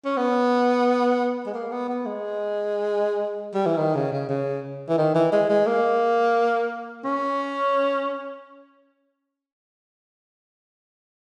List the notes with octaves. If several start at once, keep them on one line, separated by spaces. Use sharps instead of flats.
C#4
B3
G#3
A#3
B3
B3
G#3
G3
E3
D#3
C#3
C#3
C#3
E3
D#3
E3
G#3
G#3
A#3
C#4